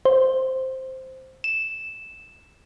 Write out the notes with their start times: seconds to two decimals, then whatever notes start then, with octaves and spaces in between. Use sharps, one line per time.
0.05 C5
1.44 E7